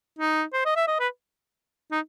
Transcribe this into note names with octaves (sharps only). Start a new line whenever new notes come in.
D#4
C5
D#5
E5
D#5
B4
D#4